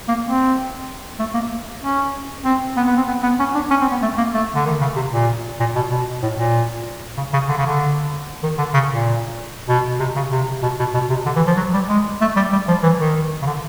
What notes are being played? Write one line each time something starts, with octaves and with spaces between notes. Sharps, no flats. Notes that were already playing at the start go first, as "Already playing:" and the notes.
A#3
C4
A3
A#3
C#4
C4
B3
B3
C4
B3
B3
C#4
D4
C#4
C4
B3
A3
A#3
A3
D3
D#3
C#3
C3
A#2
A#2
B2
B2
A2
A#2
C#3
C#3
D3
C#3
D3
D#3
D3
C#3
A#2
B2
C3
C#3
C3
B2
B2
B2
C3
D3
E3
F3
F#3
G3
G#3
A3
G3
G3
F3
E3
D#3
C#3
D3